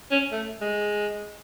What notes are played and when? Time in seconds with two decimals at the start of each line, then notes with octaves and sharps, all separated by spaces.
0.11 C#4
0.32 A3
0.61 G#3